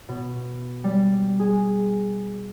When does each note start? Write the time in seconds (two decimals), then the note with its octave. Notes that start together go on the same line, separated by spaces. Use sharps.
0.09 B2
0.84 G3
1.40 G#4